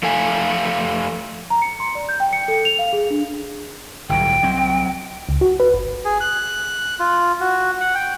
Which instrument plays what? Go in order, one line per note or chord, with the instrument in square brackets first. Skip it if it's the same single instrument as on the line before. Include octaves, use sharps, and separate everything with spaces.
[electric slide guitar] F3 A3 A4 F5 G#5
[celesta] A#5
C#7
C6
D5
G6
G5
C#7
A4
F7
F5
G#4
D4
[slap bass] G1 A2 F#3 [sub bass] C2 [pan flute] G5
[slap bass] F#3 C4
[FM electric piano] C#2
F#4
B4
G1
[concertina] G#4
F#6
F4
F#4
F#5
G5